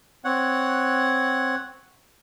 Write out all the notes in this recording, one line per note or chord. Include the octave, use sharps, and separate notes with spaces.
C4 C#5 F#5